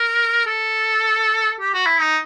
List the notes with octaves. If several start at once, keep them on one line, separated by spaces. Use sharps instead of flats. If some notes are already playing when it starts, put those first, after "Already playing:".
Already playing: A#4
A4
G4
F#4
E4
D#4